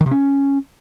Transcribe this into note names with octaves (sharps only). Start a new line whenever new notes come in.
D#3
C3
C#4